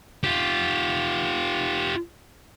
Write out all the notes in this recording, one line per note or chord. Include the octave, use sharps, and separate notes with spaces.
F4 G4